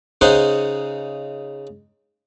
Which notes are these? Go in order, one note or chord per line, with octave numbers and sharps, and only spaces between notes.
C#3 D#4 C5 F#5